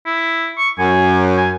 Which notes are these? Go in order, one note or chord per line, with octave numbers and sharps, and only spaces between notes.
E4
C#6
F#2 G#5
G#5